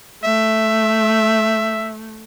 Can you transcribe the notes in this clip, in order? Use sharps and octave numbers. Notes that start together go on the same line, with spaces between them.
A3 E5